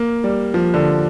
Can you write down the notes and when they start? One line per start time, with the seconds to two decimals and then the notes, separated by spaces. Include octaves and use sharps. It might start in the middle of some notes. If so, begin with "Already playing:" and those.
Already playing: A#3
0.24 G3
0.54 F3
0.74 D3